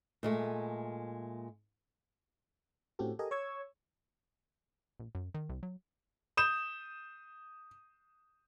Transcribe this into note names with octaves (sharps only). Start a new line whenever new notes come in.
A#2 G#3 A3
A2 C4 C#4 F#4 G4 A4
G4 A4 A#4 D#5 G#5
C#5 C#6 E6 G#6
A#1
F#2
D#3
C2
F#3
D#6 G6 E7